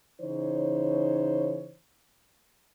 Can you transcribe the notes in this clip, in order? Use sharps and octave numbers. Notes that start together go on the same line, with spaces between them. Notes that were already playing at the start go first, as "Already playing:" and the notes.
C#3 E3 D#4 C5 C#5